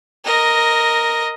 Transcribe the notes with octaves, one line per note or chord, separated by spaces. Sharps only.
A#4 D#5